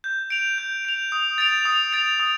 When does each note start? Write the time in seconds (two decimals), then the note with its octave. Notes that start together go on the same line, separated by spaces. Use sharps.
0.04 G6
0.30 D7 F7
0.58 G6
0.85 D7 F7
1.12 D#6
1.38 A6 D7 F7
1.65 D#6
1.93 A6 D7 F7
2.20 D#6